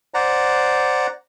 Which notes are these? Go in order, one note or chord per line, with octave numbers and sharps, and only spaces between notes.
C5 D5 F#5 A#5